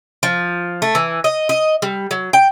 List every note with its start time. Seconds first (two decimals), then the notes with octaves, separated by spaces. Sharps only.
0.23 F3
0.82 A3
0.95 E3
1.24 D#5
1.49 D#5
1.82 G3
2.11 F#3
2.33 G5